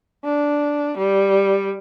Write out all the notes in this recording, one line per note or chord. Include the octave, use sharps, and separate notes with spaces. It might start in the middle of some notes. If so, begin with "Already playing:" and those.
D4
G3